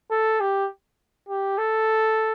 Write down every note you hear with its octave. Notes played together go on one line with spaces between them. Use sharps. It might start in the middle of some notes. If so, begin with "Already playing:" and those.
A4
G4
G4
A4